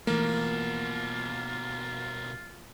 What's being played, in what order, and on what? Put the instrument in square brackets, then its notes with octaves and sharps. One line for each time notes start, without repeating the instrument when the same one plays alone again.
[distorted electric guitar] B2 F3 [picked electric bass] E3 A3 [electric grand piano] A#3 [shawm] F4